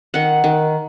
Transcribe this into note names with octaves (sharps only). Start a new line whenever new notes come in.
D#3 F#5
D#3